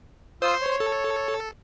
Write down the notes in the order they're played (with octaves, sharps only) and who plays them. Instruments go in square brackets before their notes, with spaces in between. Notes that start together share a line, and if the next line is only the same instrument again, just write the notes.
[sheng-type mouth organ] F4 D#6 E6 [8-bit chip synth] C5 C6
[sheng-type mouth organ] C#5
[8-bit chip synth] A4